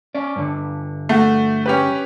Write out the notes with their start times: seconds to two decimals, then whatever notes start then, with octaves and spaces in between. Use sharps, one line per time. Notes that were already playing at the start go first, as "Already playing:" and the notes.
0.15 C#4 D5
0.36 G2 D3
1.09 A3 F#4
1.66 C#4 G4 B4